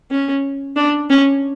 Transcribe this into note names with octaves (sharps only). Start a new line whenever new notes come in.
C#4
D4
C#4